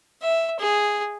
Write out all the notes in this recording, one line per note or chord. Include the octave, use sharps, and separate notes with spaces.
E5
G#4